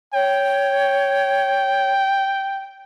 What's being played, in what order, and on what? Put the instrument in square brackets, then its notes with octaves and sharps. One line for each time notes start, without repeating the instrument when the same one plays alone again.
[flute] C#5 [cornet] G5